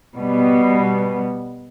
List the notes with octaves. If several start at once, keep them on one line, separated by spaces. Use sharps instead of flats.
B2 G3 B3